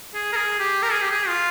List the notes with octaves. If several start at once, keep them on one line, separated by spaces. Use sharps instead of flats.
G#4
A#4
G#4
G4
A#4
G#4
G4
G#4
F4